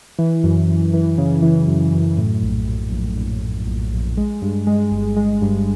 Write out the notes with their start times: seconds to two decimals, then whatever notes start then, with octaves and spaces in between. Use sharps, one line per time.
0.19 E3
0.44 F#2
0.68 F#2
0.93 E3
1.18 C#3
1.42 E3
1.68 F#2
1.93 F#2
2.18 A2
2.42 A#1
2.67 A#1
2.92 A#1
3.17 A#1
3.42 A#1
3.67 A#1
3.92 A#1
4.17 G#3
4.42 G2
4.67 G#3
4.91 G1
5.16 G#3
5.42 G2